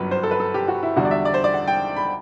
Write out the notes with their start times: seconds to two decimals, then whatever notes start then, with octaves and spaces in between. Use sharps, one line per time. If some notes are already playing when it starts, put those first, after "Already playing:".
Already playing: G1 F#2 F#3 B4
0.11 C5
0.23 A4
0.31 B4
0.40 A4
0.54 G4
0.68 F#4
0.83 E4
0.96 E2 D3 G3 F#4
1.05 D5
1.11 E5
1.25 D5
1.34 C5
1.44 D5
1.54 F#5
1.68 G5
1.96 B5